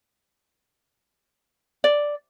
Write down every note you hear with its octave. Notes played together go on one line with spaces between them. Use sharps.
D5